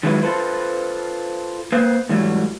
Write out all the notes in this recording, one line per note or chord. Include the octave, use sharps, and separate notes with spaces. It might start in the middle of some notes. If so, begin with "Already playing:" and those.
D#3 F#3 G#3 E4 B4
F4 A4 B4 C5
A#3 B4 C5 F5
G#2 E3 F#3 G3 A3